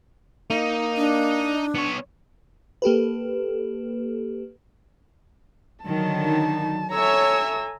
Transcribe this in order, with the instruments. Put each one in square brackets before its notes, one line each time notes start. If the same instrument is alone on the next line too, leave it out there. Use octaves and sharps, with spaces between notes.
[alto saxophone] A#3 [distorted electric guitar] D#4
[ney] D4
[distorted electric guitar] B3 C#5
[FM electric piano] A#3 G4 A4 B4
[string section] D3 D#3 F#3 [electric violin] A5
[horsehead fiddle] D#4
[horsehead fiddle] A4 G#5 [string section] C#5 E5 [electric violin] A#5 E6